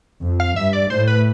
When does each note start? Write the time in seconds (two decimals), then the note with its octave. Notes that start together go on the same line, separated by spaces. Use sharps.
0.22 F2
0.40 F5
0.56 G2 E5
0.73 D5
0.90 A2 C5
1.07 B4